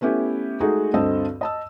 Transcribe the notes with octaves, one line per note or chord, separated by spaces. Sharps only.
A3 B3 C#4 E4 G4
G#3 A3 D#4 F#4 G#4
D2 G2 C4 A4 D#5 E6
D#5 A5 E6